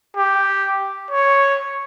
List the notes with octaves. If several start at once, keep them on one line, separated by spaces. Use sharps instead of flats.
G4
C#5